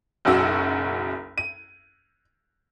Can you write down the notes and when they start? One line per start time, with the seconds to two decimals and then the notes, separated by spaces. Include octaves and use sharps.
0.25 F#1 B1 F#2 F#4 E6
1.38 D#7